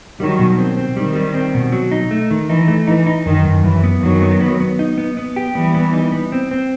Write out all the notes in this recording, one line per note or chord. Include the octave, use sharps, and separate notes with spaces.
D#3 F#3 G3
B2
C4
C4
D#3 G3
G3
C4
B2
F#3
D#4
A3
D#3
E3 D#4
A3
E3 D#4
D#4
F#2 D#3
F#2
F#2 E3
B3
F#2 D#3 F#3
B3
B3
B3
D#4
B3
B3
G4
E3 G3 B3
B3
D#4
B3
C4
C4